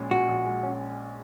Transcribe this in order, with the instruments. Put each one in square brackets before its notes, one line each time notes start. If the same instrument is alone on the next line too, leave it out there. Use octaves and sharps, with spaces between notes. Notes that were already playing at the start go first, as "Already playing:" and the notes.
Already playing: [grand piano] A#1 A#2 G#3 C#4
[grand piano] A#2 [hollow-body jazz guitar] F#4
[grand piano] A#1
G#3
C#4